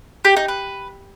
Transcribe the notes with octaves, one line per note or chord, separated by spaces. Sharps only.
G4
D#4
B4